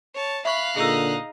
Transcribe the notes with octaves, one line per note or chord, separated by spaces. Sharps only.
C#5 A5
E5 F5 B5 C#6 F#6
A#2 D3 D#4 G#4 D#5 E6